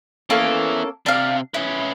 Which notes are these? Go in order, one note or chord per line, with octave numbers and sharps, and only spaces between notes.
A#3 B3 C#4 E4 A4
C3 D4 F5
C#4 E4 B4